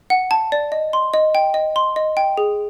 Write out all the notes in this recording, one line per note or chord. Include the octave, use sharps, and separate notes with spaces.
F#5
A5
D5
D#5
C6
D#5
G5
D#5
C6
D#5
G5
G#4